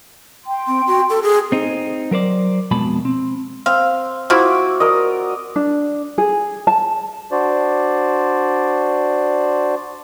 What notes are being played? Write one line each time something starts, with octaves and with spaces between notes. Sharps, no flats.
G5 C6
C4
F#4
A4
G#4
C4 D#4
F#3 A#4 C5 D5
F2 B2 G#3 A5 B5
C4
C4 F5
F3 E4 F#4 D6 E6
A#4 D5 D#5
D4
G#4
A5
D4 F#4 C5 D5